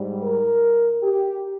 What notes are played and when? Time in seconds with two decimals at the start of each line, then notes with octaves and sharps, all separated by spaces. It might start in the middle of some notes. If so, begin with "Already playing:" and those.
Already playing: G#2 G3
0.22 A#4
1.03 G4